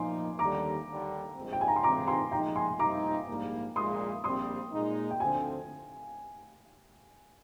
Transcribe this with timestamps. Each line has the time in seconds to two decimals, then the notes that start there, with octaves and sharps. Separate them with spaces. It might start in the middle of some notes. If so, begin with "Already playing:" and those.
Already playing: A#2 F3 A#3 D#4 G#5 C6 D6
0.39 D#2 D3 G3 A#5 D6
0.87 D#2 D3 G3
1.36 A#1 A#2 G#3 C4
1.53 G5
1.61 G#5
1.68 A#5
1.76 C6
1.83 G2 D#3 G#3 C4 A#5 D6
2.07 G#5 C6
2.32 A#2 F3 G#3 D#4 G5 A#5
2.56 G#5 C6
2.79 A#2 G3 C4 D#4 A#5 D6
3.28 A#1 G#2 G3 A#3
3.76 A#1 A#2 G#3 C6 D#6
4.24 A#1 A#2 G3 C4 C6 D#6
4.72 A#2 G#3 D#4
5.11 G5
5.20 D2 D3 F3 C4 G#5